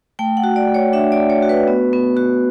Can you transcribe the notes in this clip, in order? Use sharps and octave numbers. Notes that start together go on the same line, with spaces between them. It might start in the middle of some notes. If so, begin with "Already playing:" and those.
A3 G5
F#5
F#4
D5
A3
C#5
D4 E5
D5
A3
C#5
F#4
B4
B3
B3
F#4